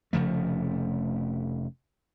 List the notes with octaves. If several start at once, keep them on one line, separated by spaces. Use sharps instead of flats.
F1 C#3 F3 A3